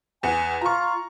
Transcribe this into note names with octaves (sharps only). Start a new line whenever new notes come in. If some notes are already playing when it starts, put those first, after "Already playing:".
E2 F#5 G#5
F4 A#5 C#6